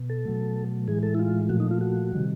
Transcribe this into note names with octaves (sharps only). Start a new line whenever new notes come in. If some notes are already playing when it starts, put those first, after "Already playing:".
Already playing: B2
A4
B2 F#3 A3
A2 E3 G#3 G#4
A4
E4
F4
A#2 F3 A3 F#4
D#4
F4
F#4
C3 D#3 G3